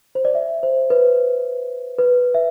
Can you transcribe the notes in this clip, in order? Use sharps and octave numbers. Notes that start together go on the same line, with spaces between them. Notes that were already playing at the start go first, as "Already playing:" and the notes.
C5
D5
E5
C5
B4
B4
E5